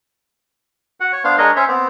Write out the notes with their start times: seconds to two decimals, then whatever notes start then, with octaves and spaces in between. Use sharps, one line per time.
1.00 F#4 F#5
1.13 C#5
1.24 B3 D4 C5 F5
1.38 G#3 D4 A#4 C#5 D#5
1.56 C#4 C5 C#5 E5
1.68 B3 C4